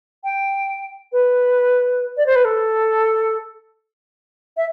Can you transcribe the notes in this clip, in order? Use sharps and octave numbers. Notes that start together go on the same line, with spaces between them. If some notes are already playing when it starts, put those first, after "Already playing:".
G5
B4
D5
C5
B4
A4
E5